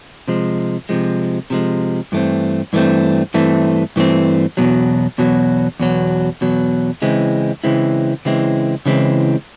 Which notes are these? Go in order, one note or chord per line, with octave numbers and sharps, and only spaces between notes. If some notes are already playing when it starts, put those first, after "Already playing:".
C3 F3 G#3
C3 F3 G#3
C3 F3 G#3
G2 E3 A3 C4
G2 E3 A3 C4
G2 E3 A3 C4
G2 E3 A3 C4
E2 B2 F#3
E2 B2 F#3
E2 B2 F#3
E2 B2 F#3
C#3 E3 G#3 C4 E4
C#3 E3 G#3 C4 E4
C#3 E3 G#3 C4 E4
C#3 E3 G#3 C4 E4